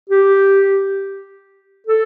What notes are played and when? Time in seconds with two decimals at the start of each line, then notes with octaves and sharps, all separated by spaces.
0.10 G4
1.87 A4